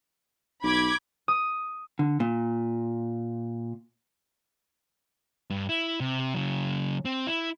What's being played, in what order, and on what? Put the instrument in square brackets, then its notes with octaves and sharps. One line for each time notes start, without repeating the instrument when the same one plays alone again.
[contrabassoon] B1 [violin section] B5 D6 G#6
[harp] D#6
[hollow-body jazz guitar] D3
A#2
[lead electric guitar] G2
E4
C3
C#3 F#3
C4
E4